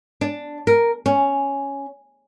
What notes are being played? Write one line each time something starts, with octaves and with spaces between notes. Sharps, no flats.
D4
A#4
C#4